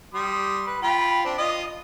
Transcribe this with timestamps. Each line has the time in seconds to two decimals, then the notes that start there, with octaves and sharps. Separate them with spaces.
0.14 G3 C6 D#6
0.67 B4
0.82 F4 G5 B5
1.25 C4 D4
1.38 F4 D#5